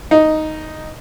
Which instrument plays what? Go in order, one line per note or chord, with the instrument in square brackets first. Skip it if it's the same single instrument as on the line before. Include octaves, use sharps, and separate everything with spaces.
[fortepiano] D#4